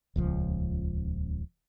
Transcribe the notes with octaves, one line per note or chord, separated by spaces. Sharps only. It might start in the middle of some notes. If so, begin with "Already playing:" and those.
D#1 C#2 F3